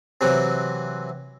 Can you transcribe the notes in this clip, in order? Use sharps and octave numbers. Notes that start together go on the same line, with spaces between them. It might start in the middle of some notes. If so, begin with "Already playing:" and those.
C3 E3 F#3 C4